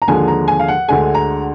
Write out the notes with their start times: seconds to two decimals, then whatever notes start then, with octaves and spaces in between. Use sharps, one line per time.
0.02 A#5
0.08 D#2 D3 F3 G#3 G#5
0.28 A#5
0.48 G#5
0.59 F5
0.68 F#5
0.88 D2 D3 G#3 G#5
1.15 A#5